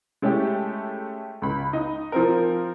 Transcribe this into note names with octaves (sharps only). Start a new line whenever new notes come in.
G#3 A3 C#4 E4 G4
C#2 B5
D#4 D#5
F3 C4 A#4